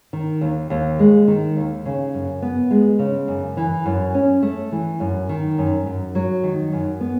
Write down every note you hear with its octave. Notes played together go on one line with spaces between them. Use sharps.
D#3
D#2
D#2
G#3
D#3
D#2
C#3
F#2
B3
G#3
C#3
F#2
E3
F#2
C#4
A3
E3
F#2
D#3
F#2
F#2
F#3
D#3
F#2
B3